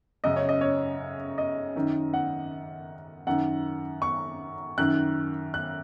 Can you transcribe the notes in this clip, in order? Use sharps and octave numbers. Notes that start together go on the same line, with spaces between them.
F#2 C#3 D#5
C#5
D#5
C#5
D#5
F#2 D#3
F#5
F#2 D#3 F#5
C#6
F#2 D#3 F#6
F#6